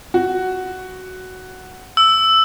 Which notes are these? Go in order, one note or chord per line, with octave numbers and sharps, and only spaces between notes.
F#4
E6